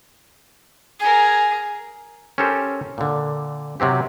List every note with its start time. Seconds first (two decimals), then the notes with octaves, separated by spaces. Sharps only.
1.00 G#4 A#4 G#5
2.38 C#4 G4 A4 A#4 C5
2.98 A#2 D3
3.80 C3 F#3 C4 G4